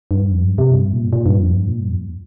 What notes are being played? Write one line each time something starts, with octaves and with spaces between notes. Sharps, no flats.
G2
F2
G2
C3
G2
A#2
A#2
G2
F2
G2
A#2
G2
F2